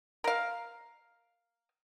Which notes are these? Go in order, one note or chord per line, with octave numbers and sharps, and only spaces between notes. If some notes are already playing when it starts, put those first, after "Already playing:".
A#4 F5